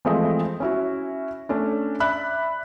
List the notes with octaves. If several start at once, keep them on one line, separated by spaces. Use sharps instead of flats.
E3 F3 G#3 A3 C4 D#5
C#4 E4 F#4
A3 C#4 D4
D5 E5 B5 F#6